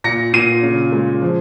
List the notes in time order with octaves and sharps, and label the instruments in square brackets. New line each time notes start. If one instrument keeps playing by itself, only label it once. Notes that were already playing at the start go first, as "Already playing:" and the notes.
[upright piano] A#2 A#6 C#7
A#2 C7 D#7
C#3
G#3
F3